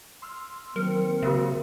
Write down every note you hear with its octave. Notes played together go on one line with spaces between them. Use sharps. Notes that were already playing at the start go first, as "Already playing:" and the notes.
C6 E6 F6
D#3 F#3 A#3 C4 A#4 C6 C#7
C#3 F#4 A#4 E5